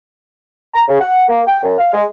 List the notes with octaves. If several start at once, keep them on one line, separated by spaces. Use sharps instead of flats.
A#5
C#3
F#5
A#3
G5
F#2
F5
G#3